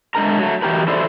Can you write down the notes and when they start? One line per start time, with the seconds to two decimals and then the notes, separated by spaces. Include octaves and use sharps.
0.15 G#3 A3 D4 A#4 A#5
0.38 F#3 A3
0.62 E3 F#4 G4 A#4 B4
0.88 E4 A4 C5 D5 E5